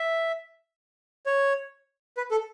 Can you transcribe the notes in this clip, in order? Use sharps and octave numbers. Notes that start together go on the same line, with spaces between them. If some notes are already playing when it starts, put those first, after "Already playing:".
Already playing: E5
C#5
B4
A4